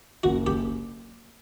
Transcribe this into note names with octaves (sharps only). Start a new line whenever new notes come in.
F#1 F#4
F#1 G4